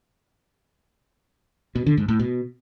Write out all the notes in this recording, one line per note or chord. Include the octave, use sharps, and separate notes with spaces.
B2
D3
G#2
A2
B2